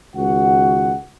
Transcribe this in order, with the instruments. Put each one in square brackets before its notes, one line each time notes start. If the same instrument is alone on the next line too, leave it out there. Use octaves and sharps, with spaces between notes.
[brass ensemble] C#2 D#3 F#4 F#5